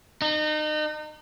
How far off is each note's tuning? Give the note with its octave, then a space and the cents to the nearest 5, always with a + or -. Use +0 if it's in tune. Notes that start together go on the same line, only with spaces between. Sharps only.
D#4 -30